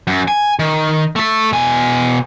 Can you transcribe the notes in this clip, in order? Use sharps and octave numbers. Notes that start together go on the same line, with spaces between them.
F#2
G#5
D#3
A3 A4
B2 G#5